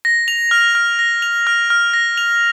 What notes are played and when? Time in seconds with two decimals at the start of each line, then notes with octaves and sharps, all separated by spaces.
0.05 A#6
0.28 F7
0.51 F6
0.75 F6
0.99 A#6
1.22 F7
1.47 F6
1.70 F6
1.94 A#6
2.18 F7